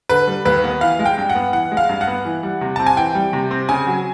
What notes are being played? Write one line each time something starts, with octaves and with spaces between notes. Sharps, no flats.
D3 B4
G3
D#2 B4
B3
E3 F5
G#3
G5
G2
F#5
B3
E3 F#5
G#3
F5
G2
F#5
B3
E3
G3
C3
C4 A5
G#5
E3 G5
G3
C3
C4
C#3 G#5
F#3